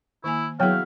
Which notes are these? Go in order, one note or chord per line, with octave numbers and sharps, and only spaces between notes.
D#3 A#3 E4 G#5
F#3 B3 E4 F#4 G#4 C#5 F5 G5